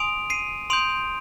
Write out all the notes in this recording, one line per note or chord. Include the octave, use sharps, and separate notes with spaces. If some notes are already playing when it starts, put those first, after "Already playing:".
Already playing: G#5 C6 D#6 D7 F7
C7 D#7
C6 D#6 G6 D7 F7